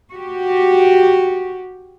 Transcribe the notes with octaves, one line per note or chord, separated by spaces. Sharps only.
F#4 G4